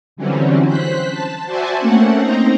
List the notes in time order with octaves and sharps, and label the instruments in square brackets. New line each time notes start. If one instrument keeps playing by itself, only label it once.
[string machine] D3 E3 F#3 G3 C4 C#4
C5 F#6 B6
A5
F#4 C5 D5 E5 G#5 A5
A3 A#3 C4 C#4 F#5
C4 D#4 C5 A#5